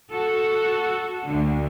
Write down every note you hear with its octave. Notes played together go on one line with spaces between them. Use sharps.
F#4 A4
D2 D3